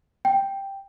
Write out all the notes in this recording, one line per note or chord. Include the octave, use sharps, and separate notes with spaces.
G5